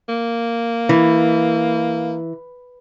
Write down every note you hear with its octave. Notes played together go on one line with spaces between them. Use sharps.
A#3
E3